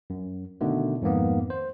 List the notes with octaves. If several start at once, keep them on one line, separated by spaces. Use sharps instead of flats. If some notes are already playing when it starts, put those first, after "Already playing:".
F#2
B2 D3 D#3 A3
F2 G#2 D#3 A#3 B3
C5